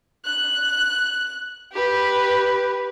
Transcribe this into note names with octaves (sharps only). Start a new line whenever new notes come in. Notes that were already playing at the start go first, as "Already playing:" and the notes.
F#6
G4 B4